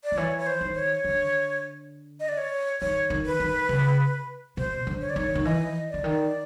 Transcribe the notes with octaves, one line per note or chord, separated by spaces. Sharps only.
D5
D#3
E3 C#5
C#5
C5
D#3
C#5
D3
D#5
D5
C#5
D#3 C#5
D#3
B4
D#3
C#3
B2 C5
D3
C#5
D5
D#3 C#5
D#3
E3 D#5
D3 D5
D#3